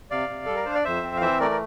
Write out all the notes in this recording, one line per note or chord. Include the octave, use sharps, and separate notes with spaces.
C3 D5 F5
C3
G3 A4
A#4
D4 C5
D5
F2 C5 E5
C4
F5
E3 C5 E5
A3 A#4 D5
A#4